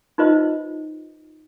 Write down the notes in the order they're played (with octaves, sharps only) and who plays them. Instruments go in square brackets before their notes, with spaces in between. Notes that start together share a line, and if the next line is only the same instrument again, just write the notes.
[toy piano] D#4 F4 B4 C5 D#5